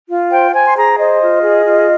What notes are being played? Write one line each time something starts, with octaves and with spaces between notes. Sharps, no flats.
F4
C5 G5
C5 G#5
C6
G#4 A#5
C5 D#5
F4
G#4
F4